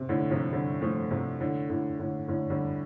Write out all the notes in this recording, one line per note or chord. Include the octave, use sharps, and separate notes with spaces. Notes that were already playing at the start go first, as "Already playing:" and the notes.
Already playing: C3
A2 D3
C3 F3
D3 G3
F3 A3
C3 F3
A2 D3
A2 D3
A2 D3
A2 D3
D3 G3